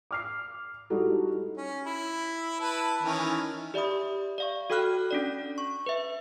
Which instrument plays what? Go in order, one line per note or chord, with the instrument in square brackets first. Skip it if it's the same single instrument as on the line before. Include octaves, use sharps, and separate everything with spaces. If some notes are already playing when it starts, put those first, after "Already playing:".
[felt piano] D6 F6 C7
G3 D#4 E4 F#4 A4
[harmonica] C#4
E4
E4 B4 A5
D#3 E3 C#4
[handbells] G4 D5 E5 B5 D#6
D5 F5 C#6
F#4 A4 G5 B5 F6 F#6
C#4 D4 D5
C#6
B4 E5